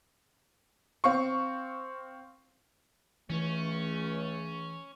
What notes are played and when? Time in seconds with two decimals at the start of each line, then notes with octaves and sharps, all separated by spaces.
1.04 C4 F5 C#6
3.30 C#2 E3 A3 C#4